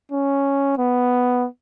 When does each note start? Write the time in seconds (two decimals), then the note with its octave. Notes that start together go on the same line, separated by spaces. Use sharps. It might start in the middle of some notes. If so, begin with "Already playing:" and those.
0.11 C#4
0.78 B3